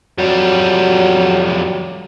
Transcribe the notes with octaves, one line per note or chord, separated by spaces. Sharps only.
F2 F#3 G3